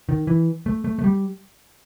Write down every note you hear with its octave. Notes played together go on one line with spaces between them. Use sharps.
D#3
E3
A3
A3
A3
G3